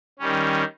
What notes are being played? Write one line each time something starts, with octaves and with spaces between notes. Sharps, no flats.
D#3 G3 C#4